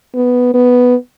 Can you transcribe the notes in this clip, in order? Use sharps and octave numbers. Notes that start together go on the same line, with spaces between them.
B3
B3